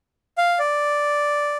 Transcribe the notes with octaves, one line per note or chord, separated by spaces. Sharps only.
F5
D5